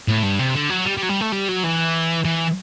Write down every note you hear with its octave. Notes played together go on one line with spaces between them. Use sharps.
A2
G2
C3
D3
F#3
G3
G3
F#3
G3
A3
G3
F#3
E3
E3